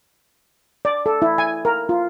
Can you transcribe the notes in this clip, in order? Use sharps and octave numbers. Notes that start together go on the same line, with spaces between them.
D5
A4
E4
G#5
A#4
F4